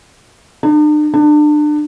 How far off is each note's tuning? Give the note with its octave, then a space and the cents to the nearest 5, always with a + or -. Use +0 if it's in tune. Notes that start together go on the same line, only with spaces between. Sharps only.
D4 +45
D4 +30